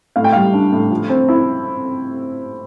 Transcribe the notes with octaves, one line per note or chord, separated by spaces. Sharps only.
A2 F5
G5
G3 F5
D4
A2
F3
C4
E4